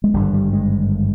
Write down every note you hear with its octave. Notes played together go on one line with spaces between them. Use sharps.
G#3
G#1 G2 D3 G3
G3
G#3